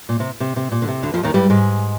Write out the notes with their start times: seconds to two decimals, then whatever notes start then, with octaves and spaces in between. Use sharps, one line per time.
0.09 A#2
0.20 C3
0.40 C3
0.56 C3
0.72 A#2
0.82 D3
0.88 C3
1.03 D2 D3
1.14 F2 F3
1.23 D#2 D#3
1.34 G2 G3
1.50 G#2 G#3